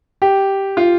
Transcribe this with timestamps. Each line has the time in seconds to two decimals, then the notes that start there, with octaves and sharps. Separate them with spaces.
0.22 G4
0.77 F4